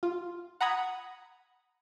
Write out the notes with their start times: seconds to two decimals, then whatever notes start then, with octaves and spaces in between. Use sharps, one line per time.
0.03 F4
0.61 F#5 A#5 B5 D#6 G#6